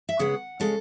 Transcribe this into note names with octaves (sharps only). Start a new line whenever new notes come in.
E5
C#3 G#3 B3 F#5
C#3 G#3 C#4 A4